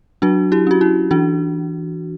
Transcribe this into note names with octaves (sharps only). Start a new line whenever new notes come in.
F#3 D4 F#4
E4 G4
C#4 F#4
E4
E3 D4 F#4